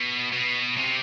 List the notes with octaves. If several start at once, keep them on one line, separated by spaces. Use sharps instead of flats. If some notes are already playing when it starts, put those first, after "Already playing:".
Already playing: B2
B2
C3